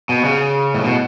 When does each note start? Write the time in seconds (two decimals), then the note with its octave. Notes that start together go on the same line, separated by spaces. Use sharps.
0.09 B2
0.25 C#3
0.74 A2
0.85 B2